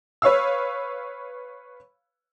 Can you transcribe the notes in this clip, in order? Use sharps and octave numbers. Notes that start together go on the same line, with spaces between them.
B4 C#5 F5 E6